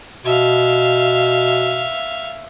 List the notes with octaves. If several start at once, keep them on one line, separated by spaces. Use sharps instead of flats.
B2 E5 F5